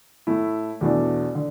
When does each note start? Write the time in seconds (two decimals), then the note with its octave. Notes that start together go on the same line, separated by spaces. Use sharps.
0.27 A2 A3 E4
0.81 E2 B2 A3 D4
1.35 D3